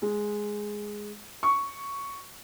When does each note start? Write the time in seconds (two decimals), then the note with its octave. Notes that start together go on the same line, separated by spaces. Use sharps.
0.02 G#3
1.43 C#6